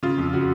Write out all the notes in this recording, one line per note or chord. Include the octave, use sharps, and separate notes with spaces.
C#3 F4
F2
C#3 F#4